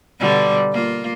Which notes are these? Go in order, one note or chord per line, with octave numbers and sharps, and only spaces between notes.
B2 D3 G3
A#3 F4